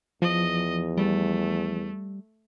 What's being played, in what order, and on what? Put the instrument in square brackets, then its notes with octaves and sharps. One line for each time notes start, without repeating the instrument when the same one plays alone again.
[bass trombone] E2 [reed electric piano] F3 [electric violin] D#5
[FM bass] G3 [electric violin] A3